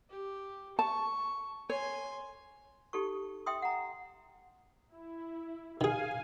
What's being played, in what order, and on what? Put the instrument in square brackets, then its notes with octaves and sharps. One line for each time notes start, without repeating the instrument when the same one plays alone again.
[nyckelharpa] G4
[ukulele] A5 [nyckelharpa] C#6
[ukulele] C#5 [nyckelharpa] G#5 C6
[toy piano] D#4 G4 A4 C#6
E5 G5 C6 D#6
F#5 A#5
[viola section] E4
[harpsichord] D#3 G#4 [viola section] F5 G#5